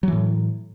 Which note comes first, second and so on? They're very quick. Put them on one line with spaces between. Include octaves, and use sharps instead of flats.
F#3 E3 A2